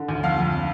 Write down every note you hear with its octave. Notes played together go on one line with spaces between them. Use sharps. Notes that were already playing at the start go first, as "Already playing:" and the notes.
Already playing: D3
D2
F2 F5
F2